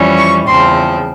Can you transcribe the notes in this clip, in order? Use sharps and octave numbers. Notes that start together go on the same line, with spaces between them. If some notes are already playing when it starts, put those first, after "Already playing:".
Already playing: F2 E3 G3 C#4
C#6
E2 C#3 F3 C4 C6